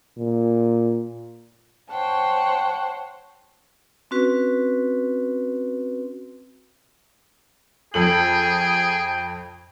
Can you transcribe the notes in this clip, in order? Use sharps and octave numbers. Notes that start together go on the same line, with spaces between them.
A#2
C5 C#5 F#5 G5 A5
C4 C#4 F#4 B4
F2 G#4 A4 G5 F#7